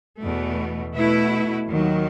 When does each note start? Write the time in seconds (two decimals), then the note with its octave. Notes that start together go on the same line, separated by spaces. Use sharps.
0.21 E2 B2 A3
0.95 B2 A3 E4 B4
1.68 D#2 D#3 F#3